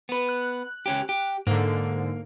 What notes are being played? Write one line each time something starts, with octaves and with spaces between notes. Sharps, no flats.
B3 B4
F#6
C#2 C#4 G4
G4
G#2 D3 A#3